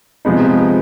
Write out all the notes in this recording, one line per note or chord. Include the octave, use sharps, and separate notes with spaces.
C3 F3 G#3 B3 D#4